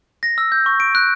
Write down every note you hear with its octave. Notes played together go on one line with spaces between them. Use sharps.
A#6
E6
G6
C#6
D7
F#6